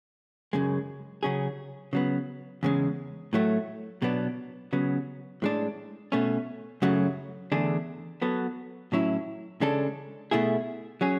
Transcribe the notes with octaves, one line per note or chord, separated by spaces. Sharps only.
F#2 C#3 G#3
C#3 F#3 C#4 G#4
C#3 F#3 B3
E2 C#3 G#3
A2 F#3 A3
B2 F#3 B3 D4
C#3 F#3 B3
A2 G#3 D4
B2 A3 C#4
F#2 C#3 F#3 A3
E2 D3 A3 D4 G#4
F#3 B3 F#4 A4
A2 F#3 C#4 E4
C#3 G#3 D4 A4
B2 A3 E4 G#4
F#3 C#4 G#4